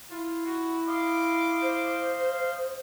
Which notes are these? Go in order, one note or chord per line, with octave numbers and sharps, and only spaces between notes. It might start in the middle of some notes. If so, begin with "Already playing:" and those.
E4 F4
F#4
D#5 F5 C6 D6
C5